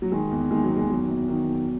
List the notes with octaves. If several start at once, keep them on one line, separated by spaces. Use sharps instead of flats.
F#3
D#3 G#3
E2
D#3 G#3
F#3
E2
G#3
D#3 F#3
E2
D#3
E2